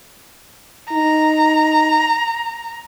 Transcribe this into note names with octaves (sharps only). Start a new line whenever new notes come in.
D#4 A#5